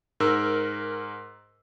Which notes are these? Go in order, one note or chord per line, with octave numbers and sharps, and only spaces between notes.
G#2 A#4 E6